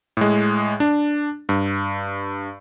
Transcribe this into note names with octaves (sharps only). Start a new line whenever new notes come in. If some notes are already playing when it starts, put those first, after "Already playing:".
A2 G#3
D4
G2